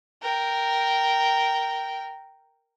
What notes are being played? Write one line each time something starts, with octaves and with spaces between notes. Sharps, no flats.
A#4 G5